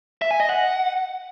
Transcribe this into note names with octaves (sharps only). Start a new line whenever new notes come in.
E5
G#5
D#5
F#5